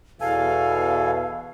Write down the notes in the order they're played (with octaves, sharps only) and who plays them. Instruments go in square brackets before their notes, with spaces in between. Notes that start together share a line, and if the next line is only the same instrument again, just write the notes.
[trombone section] E2 B2 [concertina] A4 G#5 [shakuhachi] F5